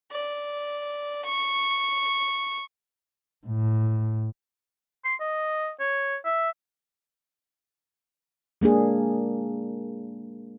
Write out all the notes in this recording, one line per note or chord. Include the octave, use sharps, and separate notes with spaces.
D5
C#6
A2
C6
D#5
C#5
E5
G#3 A#3 D4 G#4